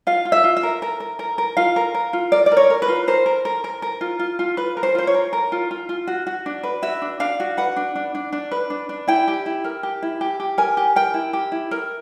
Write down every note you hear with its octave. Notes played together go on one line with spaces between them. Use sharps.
F4 F5
F4
E5
F4
E5
A#4
A#4
A#4
A#4
A#4
F4 F5
A#4
A#4
F4
A#4 D5
D5
A#4
C#5
A#4
B4
F4
A#4 C5
A#4
A#4
A#4
A#4
F4
F4
F4
F4 B4
A#4
C5
F4 C5
C#5
A#4
A#4
F4
F4
F4
F#4
F#4
D4
B4
F#4 E5
D4
D4 F5
F#4
B4 F#5
D4
D4
D4
D4
B4
D4
D4
E4 G5
G4
E4
A#4
G4
E4
G4
G4
A#4 G#5
G4
A#4 G5
E4
G4
E4
A#4